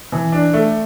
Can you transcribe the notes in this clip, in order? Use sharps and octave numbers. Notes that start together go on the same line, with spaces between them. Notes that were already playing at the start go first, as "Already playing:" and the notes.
E3
D4
A3